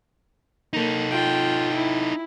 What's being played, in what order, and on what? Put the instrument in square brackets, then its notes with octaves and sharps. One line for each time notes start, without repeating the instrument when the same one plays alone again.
[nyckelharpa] A#3 [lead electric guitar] D#4 A4
[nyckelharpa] F4 G5
E4